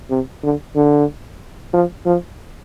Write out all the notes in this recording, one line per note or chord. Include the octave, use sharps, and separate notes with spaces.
C3
D3
D3
F3
F3